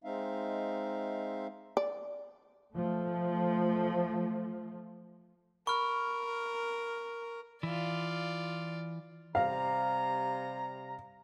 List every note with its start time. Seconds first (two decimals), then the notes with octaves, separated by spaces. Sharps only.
0.04 G#3 C4 D#4 E5 F5
1.77 D5
2.73 F3 A3
5.67 A#4 B5 C#6 F6
7.63 E3 F4 D5
9.35 C3 G3 F5 A#5